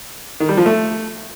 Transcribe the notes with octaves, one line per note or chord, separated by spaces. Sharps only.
D#3
G3
F3
A3